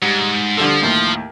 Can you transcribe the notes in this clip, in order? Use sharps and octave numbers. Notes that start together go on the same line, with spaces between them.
G#2 G3
D3 F3 G3 A4
D#2 A2